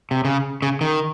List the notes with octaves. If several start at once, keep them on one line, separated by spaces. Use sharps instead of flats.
C3
C#3
C#3
D#3